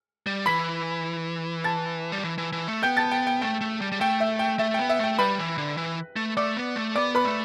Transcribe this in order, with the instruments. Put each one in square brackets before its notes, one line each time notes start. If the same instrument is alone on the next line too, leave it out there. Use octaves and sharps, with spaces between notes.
[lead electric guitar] G3
[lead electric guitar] E3 [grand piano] B5 B6
[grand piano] A5 A6
[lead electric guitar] G3
E3
E3
E3
A3
[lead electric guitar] B3 [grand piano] G5 G6
[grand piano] A5 A6
G5
G5
[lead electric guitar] A3 [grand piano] G5
[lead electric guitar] A3
G3
G3
[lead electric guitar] A3 [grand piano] G5
[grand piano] E5
G5
[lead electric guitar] A3 [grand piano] E5
[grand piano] G5
[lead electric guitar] B3
[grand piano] E5
[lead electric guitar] A3 [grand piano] G5
[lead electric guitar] G3 [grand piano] B4 B5
[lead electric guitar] E3
D3
E3
A3
[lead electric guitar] A3 [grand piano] D5 D6
[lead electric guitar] B3
A3
[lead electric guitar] B3 [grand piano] D5 D6
[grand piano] B4 B5
[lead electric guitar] A3